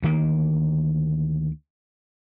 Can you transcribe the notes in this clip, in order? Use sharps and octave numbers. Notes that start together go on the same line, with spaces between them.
D2 D#3 A#3